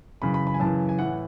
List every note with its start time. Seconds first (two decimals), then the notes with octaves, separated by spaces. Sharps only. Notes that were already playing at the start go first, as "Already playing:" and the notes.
0.22 F#2 C#3 E3 B5
0.34 B5
0.47 B5
0.54 G#5
0.60 F#2 C#3 E3 A5
0.89 G#5
0.99 A2 E3 F#5